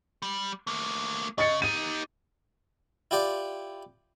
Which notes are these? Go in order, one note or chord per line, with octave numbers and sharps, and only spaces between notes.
G3
A3 A#3
C#3 D#5 A6 C#7
D#4 G4 D#7
E4 F4 G4 D5 G5